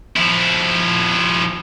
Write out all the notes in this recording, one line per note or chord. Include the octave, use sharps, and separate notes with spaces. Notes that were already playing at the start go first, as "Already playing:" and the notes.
F3 E4